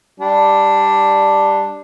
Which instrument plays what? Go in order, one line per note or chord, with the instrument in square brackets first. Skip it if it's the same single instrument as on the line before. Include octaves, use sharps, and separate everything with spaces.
[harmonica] G3 D4